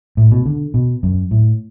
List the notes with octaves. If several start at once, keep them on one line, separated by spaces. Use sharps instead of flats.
A2
B2
D3
B2
F#2
A2